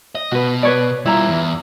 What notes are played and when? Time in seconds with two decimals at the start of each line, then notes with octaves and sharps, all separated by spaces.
0.15 D#5
0.31 B2 F#4 B4
0.63 B4 C#5 D5
1.06 G3 E4 F4 A#5
1.28 E2